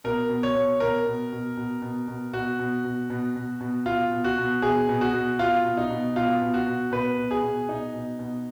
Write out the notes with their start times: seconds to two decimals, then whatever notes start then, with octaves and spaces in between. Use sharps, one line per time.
0.04 B2 A#4
0.30 B2
0.43 C#5
0.55 B2
0.80 B2 A#4
1.06 B2
1.32 B2
1.57 B2
1.82 B2
2.08 B2
2.33 B2 F#4
2.59 B2
2.84 B2
3.10 B2
3.36 B2
3.60 B2
3.86 B2 F4
4.11 B2
4.24 F#4
4.38 B2
4.62 B2 G#4
4.89 B2
5.01 F#4
5.13 B2
5.39 B2 F4
5.65 B2
5.77 D#4
5.90 B2
6.16 B2 F4
6.42 B2
6.54 F#4
6.67 B2
6.91 B2 B4
7.18 B2
7.31 G#4
7.42 B2
7.68 B2 D#4
7.94 B2
8.19 B2